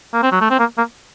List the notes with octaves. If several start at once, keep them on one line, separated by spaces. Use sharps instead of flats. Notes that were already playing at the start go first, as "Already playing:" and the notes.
A#3
C4
F#3
A3
C4
A#3
A#3